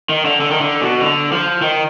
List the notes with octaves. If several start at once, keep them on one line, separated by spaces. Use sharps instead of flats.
D#3
D3
D3
D#3
D3
B2
D3
F3
D#3